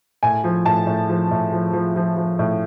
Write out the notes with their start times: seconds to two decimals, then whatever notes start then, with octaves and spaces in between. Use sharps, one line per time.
0.23 A2 G#5
0.44 F3
0.66 A2 A5
0.87 A2
1.09 F3
1.31 A2
1.52 F3
1.73 F3
1.96 F3
2.17 F3
2.39 A2